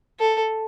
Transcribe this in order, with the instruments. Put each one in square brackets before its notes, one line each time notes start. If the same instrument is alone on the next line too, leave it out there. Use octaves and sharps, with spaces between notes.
[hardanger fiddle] A4